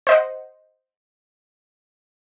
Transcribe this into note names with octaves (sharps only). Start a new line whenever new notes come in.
C5 D#5 F#5